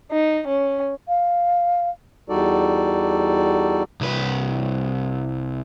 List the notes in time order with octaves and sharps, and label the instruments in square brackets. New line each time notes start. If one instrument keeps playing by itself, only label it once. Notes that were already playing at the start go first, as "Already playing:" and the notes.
[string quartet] D#4
C#4
[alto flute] F5
[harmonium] E2 G3 D#4 F#4 A4 D5
[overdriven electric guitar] C2 B4